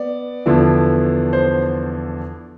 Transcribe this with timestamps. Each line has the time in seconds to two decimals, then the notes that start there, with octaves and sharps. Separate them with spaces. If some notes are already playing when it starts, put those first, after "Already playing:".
Already playing: B3 D5
0.46 E2 D3 F3 B3 E4
1.33 C5